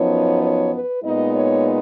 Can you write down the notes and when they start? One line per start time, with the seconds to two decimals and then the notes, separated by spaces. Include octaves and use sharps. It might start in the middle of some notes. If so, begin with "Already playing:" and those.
Already playing: F#2 F3 B3 D#4 C#5
0.43 C#5
0.73 B4
1.04 A#2 G#3 B3 D#4 D#5
1.35 C#5